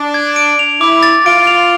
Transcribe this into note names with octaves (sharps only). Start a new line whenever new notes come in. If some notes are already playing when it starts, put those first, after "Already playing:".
Already playing: D4
G#6
D7
F7
E4 D6
A6
F4 D7
F7